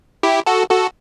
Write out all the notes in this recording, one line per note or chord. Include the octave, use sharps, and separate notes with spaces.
E4 G4
F#4 A4
F#4 A4